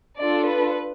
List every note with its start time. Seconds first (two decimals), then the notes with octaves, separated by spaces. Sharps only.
0.19 D4 F4 A4 D5
0.48 B4